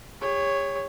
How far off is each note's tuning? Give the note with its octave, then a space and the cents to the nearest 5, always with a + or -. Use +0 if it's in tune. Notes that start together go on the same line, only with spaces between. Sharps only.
G4 +45 C#5 +0